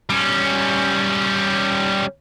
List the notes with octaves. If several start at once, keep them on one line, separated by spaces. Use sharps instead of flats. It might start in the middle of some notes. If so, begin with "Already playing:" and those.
G3 C#4